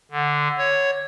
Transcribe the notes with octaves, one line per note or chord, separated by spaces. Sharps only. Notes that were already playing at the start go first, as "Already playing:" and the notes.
D3
C#5